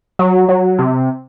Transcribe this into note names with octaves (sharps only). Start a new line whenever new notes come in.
F#3
F#3
C3